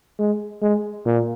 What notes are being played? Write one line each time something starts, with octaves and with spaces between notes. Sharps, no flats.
G#3
G#3
A#2